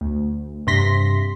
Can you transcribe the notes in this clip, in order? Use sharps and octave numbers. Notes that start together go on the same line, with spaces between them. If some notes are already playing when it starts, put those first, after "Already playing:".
D2
G2 C3 C6 A#6 B6